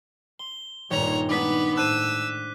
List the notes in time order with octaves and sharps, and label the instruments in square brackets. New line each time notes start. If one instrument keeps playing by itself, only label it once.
[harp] C6 [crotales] G7
[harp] D#1 [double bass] G2 A#2 [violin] C#5 A#5
[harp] G#3 D4 D#4 [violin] B3 B4 [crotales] D6 B6
[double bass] A2 [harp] C5 A5 [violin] E6 [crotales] F#6 D#7